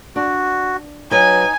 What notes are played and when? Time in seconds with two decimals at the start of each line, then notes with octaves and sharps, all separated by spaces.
0.16 D4 F#4
1.11 F#3 D#4 B4 G#5